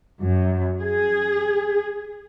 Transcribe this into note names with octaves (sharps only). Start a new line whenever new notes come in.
F#2
G#4